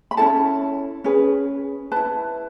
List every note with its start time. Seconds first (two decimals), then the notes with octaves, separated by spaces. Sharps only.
0.11 B5
0.17 C#4 E4 A4 A5
1.04 C#4 G#4 B4
1.92 E4 B4 A5